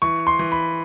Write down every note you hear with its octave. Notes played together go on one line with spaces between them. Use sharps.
E3 C#6
C6
E3
B5